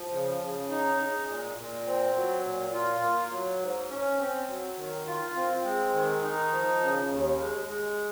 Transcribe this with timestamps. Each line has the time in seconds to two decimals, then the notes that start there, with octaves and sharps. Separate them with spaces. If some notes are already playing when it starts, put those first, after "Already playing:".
Already playing: F3
0.12 C#3
0.41 C#3
0.70 D#4
0.99 G#3
1.28 A#2
1.57 A#2
1.87 C4
2.15 F#3
2.45 A#2
2.73 F4
3.02 A#3
3.32 F#3
3.60 G#2
3.90 C#4
4.19 C4
4.48 F#3
4.78 D#3
5.07 F4
5.36 C4
5.65 G#3
5.94 D#3
6.23 D#4
6.52 F3
6.81 C#3
7.11 D#2
7.40 G#3
7.68 G#3